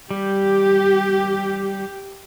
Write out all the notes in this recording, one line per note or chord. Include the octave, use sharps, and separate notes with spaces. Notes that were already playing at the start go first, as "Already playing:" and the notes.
G3 G4